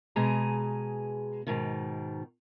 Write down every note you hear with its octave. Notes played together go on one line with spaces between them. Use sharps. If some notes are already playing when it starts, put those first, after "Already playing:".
B2 G#3 G#4 G#5 A#5
G#2 B2 D#3